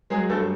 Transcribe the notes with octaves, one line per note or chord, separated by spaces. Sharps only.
F#3 G#3 G#4
G2 A3 A4